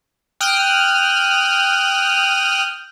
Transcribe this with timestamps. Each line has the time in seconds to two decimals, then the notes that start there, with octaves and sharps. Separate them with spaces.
0.40 G5 D#6 F6 F#6